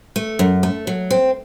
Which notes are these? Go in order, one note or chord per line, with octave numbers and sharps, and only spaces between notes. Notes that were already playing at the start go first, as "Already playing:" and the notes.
A3
F#2
A3
F#3
C4